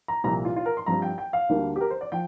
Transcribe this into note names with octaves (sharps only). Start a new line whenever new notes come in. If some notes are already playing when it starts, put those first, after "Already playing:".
A#5
C2 A#2 F3 A#5
F4
F4
A#4
C6
G2 F3 C4 A#5
G5
G5
F5
D2 D3 G3 A#3 D4
G4
A#4
C5
D5
F3 G5